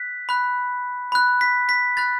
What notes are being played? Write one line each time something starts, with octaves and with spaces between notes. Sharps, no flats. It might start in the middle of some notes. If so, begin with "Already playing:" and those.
Already playing: F#6 B6
B5 F#6
B5 F#6
B6
B6
B5 F#6 A6